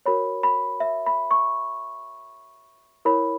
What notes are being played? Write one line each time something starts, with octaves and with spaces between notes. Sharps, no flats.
F#4 A#4 C#5 B5
B5
E5
B5
C#6
E4 A#4 C#5 B5